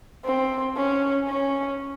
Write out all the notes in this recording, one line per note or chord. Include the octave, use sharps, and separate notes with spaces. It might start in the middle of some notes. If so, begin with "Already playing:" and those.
C4
C#4
C#4